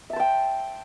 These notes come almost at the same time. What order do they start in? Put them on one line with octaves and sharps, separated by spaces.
E5 A5 C5 G5